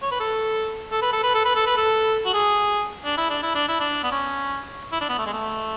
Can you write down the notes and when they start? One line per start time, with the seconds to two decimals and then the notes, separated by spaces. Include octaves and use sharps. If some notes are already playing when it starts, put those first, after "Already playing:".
0.02 C#5
0.11 B4
0.20 A4
0.91 A4
1.02 B4
1.13 A4
1.23 B4
1.35 A4
1.45 B4
1.56 A4
1.67 B4
1.77 A4
2.26 F#4
2.34 G#4
3.05 D4
3.17 E4
3.30 D4
3.43 E4
3.55 D4
3.68 E4
3.80 D4
4.04 B3
4.12 C#4
4.92 E4
5.01 D4
5.09 B3
5.18 A3
5.26 G#3
5.33 A3